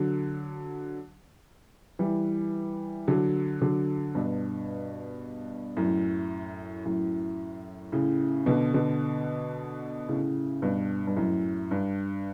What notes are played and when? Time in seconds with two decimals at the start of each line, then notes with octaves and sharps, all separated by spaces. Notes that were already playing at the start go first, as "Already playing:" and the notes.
Already playing: D3 F#3
1.99 E3 G3
3.08 D3 F#3
3.62 D3 F#3
4.15 G2 B2
5.77 F#2 A2
6.85 F#2 A2
7.92 A2 C#3
8.46 B2 D3
8.74 B2 D3
10.09 A2 C#3
10.62 G2 B2
11.07 G2
11.17 F#2 A2
11.71 G2